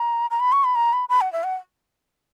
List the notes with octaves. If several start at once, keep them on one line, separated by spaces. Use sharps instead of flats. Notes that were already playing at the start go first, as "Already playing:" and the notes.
Already playing: A#5
A#5
B5
C#6
B5
A#5
B5
B5
F#5
E5
F#5